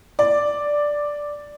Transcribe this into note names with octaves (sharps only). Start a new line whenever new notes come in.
D5